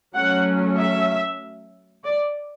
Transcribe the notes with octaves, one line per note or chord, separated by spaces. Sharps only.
F#3 A3 C#4 F#5
E5
D5